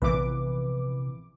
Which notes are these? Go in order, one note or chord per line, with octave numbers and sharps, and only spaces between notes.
A#1 C3 E3 B3 C4 B4 D6